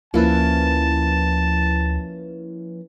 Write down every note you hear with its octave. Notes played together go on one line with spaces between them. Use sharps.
D2 F3 A#3 C#4 E4 B4 A5